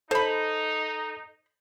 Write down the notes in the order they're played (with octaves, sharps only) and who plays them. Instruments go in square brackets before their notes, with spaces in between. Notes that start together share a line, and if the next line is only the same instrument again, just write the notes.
[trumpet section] D#4 [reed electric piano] A4 [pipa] C5 B5